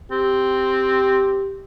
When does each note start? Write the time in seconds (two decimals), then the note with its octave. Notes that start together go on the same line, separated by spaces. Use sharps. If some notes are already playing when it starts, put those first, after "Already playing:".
0.12 C4 G4